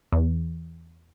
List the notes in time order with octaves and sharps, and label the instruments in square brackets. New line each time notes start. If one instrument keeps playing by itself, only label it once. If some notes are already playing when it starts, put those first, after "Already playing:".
[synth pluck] E2